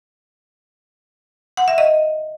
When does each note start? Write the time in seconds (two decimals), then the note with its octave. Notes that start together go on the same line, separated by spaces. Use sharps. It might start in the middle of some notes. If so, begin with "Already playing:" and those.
1.57 F#5
1.68 E5
1.78 D#5